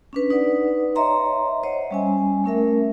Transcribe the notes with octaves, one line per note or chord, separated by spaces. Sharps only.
C#4 D4 B4
D#4 B4 D5 F#5
C#5 D#5 E5 A#5 C6
C5 C#5 D#5 E5 F#5
G3 C#4 G#5
A3 C#4 A#4 E5